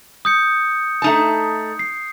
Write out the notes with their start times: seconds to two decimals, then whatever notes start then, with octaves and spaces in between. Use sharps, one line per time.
0.25 D#6 G6 C#7
1.02 A3 D#4 A5
1.79 C7